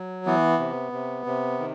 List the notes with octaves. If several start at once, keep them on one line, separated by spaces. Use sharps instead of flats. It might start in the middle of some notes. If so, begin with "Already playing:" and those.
Already playing: F#3
E3 B3
C3
C3
C3
D#3